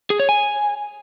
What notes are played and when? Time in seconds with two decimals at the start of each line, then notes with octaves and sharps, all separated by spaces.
0.10 G#4
0.19 C#5
0.29 G#5